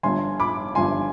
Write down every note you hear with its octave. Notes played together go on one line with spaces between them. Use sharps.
G1 G2 F3 G#5 C6
B5 D6
G1 G2 F3 G#5 C6